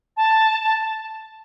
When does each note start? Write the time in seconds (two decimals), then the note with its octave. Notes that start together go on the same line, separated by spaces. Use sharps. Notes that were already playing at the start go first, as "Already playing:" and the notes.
0.17 A5
0.62 A5